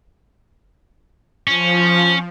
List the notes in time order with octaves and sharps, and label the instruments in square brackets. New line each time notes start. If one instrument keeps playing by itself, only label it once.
[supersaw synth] F3 [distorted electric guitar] C#4